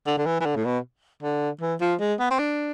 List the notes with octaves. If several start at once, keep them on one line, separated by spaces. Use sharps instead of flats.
D3
D3
E3
E3
D3
A2
B2
D3
E3
F3
G#3
B3
C4
D4